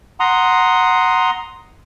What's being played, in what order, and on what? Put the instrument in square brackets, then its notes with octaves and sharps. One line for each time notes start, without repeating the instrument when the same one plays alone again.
[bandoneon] F#5 A#5 C6 D#6